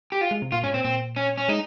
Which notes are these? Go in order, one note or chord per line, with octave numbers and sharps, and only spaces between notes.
G4
F4
G#3
C3
A#2 F4
G#2 C#4
A#2 C4
A#2 C4
C#4
C#4
G#3 D#4